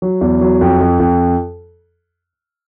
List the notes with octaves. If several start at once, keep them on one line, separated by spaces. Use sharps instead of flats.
F#3
E2
F#3
F2
F2
F2